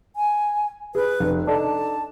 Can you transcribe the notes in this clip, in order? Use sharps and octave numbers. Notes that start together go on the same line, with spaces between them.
G#5
G#4 B4
F1
D4 D#4 A4 A5